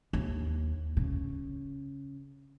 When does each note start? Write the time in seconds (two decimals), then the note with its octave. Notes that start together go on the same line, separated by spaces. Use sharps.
0.13 D#2
0.97 C#3